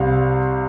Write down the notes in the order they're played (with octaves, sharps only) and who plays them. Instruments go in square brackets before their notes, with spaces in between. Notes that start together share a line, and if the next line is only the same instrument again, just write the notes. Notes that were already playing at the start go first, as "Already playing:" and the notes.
Already playing: [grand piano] C2 C3 G3 F5